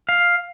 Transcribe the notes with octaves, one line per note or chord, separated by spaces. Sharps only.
F5